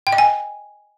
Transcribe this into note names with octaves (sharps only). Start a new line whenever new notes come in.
G5
D#5
G#5